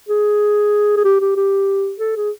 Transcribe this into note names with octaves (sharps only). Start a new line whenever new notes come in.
G#4
G#4
G4
G4
G4
A4
G#4